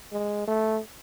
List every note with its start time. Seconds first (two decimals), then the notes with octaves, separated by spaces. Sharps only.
0.13 G#3
0.48 A3